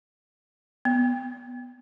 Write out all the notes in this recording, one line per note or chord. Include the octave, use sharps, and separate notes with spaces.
B3